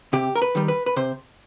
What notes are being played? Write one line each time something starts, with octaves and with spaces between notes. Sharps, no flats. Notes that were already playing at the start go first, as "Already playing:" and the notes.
C3 G4
A#4
B4
D#3 G3
B4
B4
C3 C5